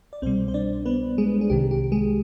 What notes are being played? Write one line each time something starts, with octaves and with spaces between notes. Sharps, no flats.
D5
C2 B2 G3 C4 C5
C5
D4 D5
B3 B4
G#3 G#4
G#4
C2 C3 D#3 G4
G4
G#3 G#4